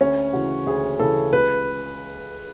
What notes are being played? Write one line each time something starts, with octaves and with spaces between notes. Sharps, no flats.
D2 C#4
C#3 E3 F#4
D2 G#4
C#3 E3 A4
C#2 B4